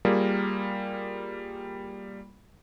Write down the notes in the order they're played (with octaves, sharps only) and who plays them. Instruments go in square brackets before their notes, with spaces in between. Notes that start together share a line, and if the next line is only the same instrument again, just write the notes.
[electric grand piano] G3 A#3 F4 G#4 A#4